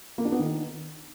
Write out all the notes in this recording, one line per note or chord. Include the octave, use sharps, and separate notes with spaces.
A#3
D4
B3
D#3